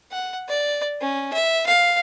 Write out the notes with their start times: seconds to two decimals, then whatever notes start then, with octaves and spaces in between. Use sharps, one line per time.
0.11 F#5
0.48 D5
1.01 C#4
1.33 E5
1.66 F5